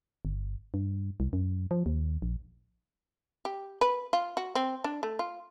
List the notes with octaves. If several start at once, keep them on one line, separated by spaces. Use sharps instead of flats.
G1
G2
C2
F#2
F3
D#2
A#1
G4
B4
F4
F#4
C4
D4
A3
F4